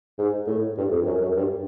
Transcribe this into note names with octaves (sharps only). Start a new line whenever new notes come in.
G#2
A2
G2
F2
F#2
F#2
G2